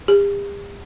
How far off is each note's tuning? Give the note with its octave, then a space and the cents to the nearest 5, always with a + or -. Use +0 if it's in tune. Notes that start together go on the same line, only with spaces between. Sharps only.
G4 +45